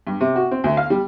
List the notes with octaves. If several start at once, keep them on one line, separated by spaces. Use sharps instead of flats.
G2
C3
F#4
C4
D2
F5
G3